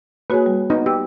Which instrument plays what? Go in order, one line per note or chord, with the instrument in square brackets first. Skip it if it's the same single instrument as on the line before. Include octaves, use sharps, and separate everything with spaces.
[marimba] A#3 F#4 C#5 [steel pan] G#4 B4
[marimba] G3
[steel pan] B3 D#4
[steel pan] G4 [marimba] E6